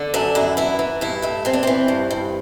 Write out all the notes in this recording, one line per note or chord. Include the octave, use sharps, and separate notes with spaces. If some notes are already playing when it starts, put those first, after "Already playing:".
Already playing: D3
F#2 D4
F#2 E4
E3 E4
E3
G2 E4
G2 A3
E3 C4
D4
E3 C4
G2
G2